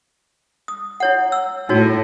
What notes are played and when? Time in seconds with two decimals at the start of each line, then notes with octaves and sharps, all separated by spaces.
0.68 D#6
1.00 E4 C#5 F#5
1.32 E6
1.69 A2 D#4 F#4 C#5